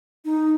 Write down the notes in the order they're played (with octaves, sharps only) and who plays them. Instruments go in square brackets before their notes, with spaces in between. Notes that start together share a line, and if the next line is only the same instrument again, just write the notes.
[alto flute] D#4